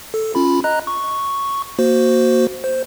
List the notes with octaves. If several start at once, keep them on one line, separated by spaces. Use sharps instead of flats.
A4
C#4 F4 B5
D#5 A#5 F#6
C#6
A#3 F#4 C5
C5